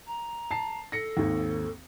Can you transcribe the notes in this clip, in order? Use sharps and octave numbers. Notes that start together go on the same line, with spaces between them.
A#5
A5 C7
A4 A#6 C#7
G#1 D#2